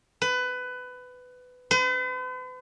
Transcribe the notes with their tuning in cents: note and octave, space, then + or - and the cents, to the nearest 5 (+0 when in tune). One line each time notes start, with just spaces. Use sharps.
B4 +20
B4 +45